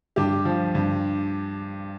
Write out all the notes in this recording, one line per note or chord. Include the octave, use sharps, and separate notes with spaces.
G2 G4
F3
G2